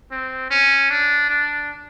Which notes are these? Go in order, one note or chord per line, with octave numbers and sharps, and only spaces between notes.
C4
C#4
D4
D4